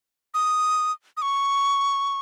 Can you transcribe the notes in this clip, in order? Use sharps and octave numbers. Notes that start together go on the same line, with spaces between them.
D#6
D#6
C#6